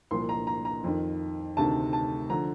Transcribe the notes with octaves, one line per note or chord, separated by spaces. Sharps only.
C2 A#2 F3 C6
A#5
A#5
A#5
F2 D#3
D2 C3 D#3 A5
A5
D3 F3 A#5